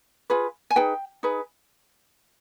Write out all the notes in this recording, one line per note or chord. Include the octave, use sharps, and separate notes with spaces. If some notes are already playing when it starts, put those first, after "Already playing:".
F4 G#4 B4
G#5
D#4 G#4 B4 G5
D#4 G#4 B4